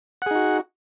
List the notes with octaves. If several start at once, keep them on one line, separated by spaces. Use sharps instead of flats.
D#4 F#4 G#4 F#5